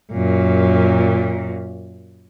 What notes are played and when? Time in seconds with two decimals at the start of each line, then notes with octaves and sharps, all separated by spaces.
0.13 F#2 A#2